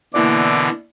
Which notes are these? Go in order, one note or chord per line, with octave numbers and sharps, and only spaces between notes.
B2 D3 E3 A#3 E4 D5 D6